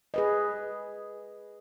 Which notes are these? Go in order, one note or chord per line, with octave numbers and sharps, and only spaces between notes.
G#4 B4 D#5